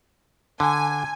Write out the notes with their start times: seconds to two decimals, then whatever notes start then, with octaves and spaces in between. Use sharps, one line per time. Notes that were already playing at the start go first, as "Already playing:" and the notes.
0.60 D3 G#5